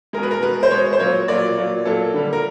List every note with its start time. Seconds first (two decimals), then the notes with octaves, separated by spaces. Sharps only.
0.13 G#3 A#4
0.18 B2 B4
0.31 A#4
0.42 B2 G#3 B4
0.63 C5
0.71 B2 G#3 C#5
0.93 C5
1.00 A#2 F#3 A#3 C#5
1.28 A#2 F#3 A#3 D5
1.57 A#2 F#3 A#3
1.85 A#2 F#3 A#3 A4
2.14 D3 G3 A#3
2.33 A#4